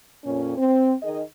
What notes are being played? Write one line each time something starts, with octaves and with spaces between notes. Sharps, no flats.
F2 A#2 C#4
C4
D#3 G#4 D#5